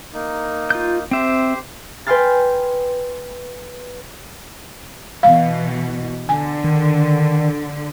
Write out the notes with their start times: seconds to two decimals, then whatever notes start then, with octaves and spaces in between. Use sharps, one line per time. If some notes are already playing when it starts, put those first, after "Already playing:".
0.14 A#3 D#4
0.70 F4 G6
1.11 C4 G4 C5 E5
2.07 B4 G5 G#5 C6 F6 A6
5.23 B2 E3 F5
6.29 D3 G#5
6.64 D#3